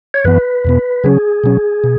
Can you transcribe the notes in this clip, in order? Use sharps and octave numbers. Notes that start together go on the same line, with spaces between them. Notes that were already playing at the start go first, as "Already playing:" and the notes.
C#5
F#2 E3 B3 B4
E2 B2 B3
C#3 F#3 C#4 G#4
B2 F#3 C#4
B2